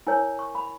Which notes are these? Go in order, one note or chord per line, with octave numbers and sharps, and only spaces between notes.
E4 A#4 C#5 G#5
C#6
B5